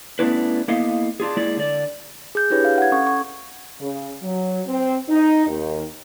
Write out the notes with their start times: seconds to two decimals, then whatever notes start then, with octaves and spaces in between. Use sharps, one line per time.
0.19 A3 B3 C#4 D4 E4 B4
0.68 A#3 B3 E4 A4 D#5 F5
1.20 D4 F4 G#4
1.37 G#3 A#3 E4 G#4 D5
1.57 D3 D5
2.35 G#4 G6
2.50 D4 E4 G4 B4 C#5
2.65 F5
2.78 F#5 G#6
2.92 C#4 A4 C#6
3.07 C#6
3.81 C#3
4.22 F#3
4.66 C4
5.09 D#4
5.46 D#2